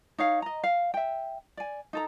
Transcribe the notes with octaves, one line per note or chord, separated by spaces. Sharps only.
D#4 C#5 F5
D#5 A#5
F5
E5 G5
D5 G#5
D#4 A4 A#5